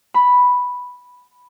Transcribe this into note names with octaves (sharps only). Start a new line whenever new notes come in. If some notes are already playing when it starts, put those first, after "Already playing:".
B5